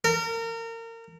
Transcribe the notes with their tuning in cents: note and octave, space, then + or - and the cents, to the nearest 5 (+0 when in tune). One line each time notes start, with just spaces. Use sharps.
A#4 -30